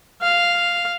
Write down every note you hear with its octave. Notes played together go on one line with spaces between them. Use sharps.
F5